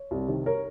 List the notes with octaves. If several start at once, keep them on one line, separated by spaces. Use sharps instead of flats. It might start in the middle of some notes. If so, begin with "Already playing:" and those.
Already playing: C#5
C2
C3 D#3
A#4 C#5